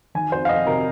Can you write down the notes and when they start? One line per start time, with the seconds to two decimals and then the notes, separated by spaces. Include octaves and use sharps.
0.15 D#3 G#5
0.32 F2 C5
0.45 F5
0.49 F2 D#5
0.67 C3 A#4